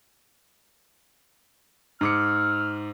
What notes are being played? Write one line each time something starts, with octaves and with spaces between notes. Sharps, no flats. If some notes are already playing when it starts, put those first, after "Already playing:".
G#2 D6 E6 F6 C#7